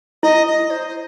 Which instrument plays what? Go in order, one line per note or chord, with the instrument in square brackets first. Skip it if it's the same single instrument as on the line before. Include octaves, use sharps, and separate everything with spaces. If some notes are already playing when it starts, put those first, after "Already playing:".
[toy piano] E4 [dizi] D#5
[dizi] D#5
C5
C5